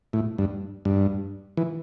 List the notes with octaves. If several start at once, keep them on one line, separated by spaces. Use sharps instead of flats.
A2
G2
G2
E3